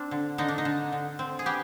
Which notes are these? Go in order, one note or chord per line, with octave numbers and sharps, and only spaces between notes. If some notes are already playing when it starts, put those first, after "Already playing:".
Already playing: C4 D4
D3
D3 D#4
D4
D#4
D3
D3
C4
G#4
B3 G4